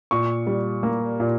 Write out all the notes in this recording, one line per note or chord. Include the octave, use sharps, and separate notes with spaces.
A#2 C#6
G3
A#3
A#2